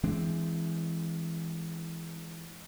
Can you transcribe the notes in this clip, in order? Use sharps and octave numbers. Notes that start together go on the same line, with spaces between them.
E3 G#3 C4 D4